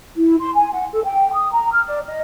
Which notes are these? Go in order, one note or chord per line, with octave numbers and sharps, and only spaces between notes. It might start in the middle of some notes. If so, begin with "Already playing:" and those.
E4
C6
G#5
F#5
A4
G5
D#6
A#5
F6
D5
D#5